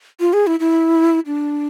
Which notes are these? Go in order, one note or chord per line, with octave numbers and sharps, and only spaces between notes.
F4
G#4
E4
E4
D4